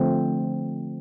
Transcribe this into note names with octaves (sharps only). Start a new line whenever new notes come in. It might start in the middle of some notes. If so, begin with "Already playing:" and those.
Already playing: D3 F3 A3 C4